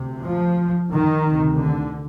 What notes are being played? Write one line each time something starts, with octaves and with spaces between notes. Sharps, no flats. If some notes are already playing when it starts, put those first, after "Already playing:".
Already playing: D2 C3
F3
D#3
D2 C3
D3